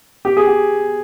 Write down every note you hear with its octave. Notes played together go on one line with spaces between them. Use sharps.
G4
G#4
G4